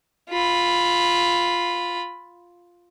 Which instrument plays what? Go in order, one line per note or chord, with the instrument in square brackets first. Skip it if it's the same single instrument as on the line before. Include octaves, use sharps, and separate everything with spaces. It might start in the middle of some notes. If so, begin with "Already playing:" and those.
[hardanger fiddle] F4 B5